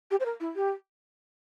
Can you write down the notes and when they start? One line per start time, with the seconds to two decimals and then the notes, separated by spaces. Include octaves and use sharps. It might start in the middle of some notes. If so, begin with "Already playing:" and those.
0.11 G4
0.20 C5
0.25 A#4
0.40 E4
0.56 G4